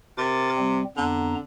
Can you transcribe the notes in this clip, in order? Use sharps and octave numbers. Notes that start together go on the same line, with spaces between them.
C3 A#4 D6 A6
G3 C4
F2 D3 B3 A#5